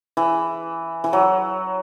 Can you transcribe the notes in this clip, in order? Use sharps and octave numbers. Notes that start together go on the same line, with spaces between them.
E3
E3
F#3